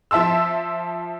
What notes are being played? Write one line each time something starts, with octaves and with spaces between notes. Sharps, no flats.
F3 E5 A5 C6 E6